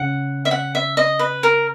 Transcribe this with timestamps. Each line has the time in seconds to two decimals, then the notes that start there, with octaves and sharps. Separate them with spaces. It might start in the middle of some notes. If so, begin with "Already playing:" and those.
Already playing: C#3 F#5
0.45 E5
0.51 F#5
0.75 E5
0.97 D#5
1.19 B4
1.43 A#4